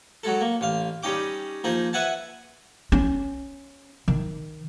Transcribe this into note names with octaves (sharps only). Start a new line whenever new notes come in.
F#3 G#3 A4
A#3
A1 F5
G3 C#4 D#4 D#5 G5 D6
F3 A#3 D#4 G#4
B4 E5 F#5 G#5 A5
C#4
D#3